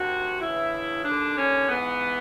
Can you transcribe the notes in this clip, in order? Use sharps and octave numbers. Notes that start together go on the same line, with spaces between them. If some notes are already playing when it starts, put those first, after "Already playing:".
Already playing: D2 C3 D#3 F#4
D2 C#3 E3 E4
D#2 D3 D4
C#4
G#2 E3 B3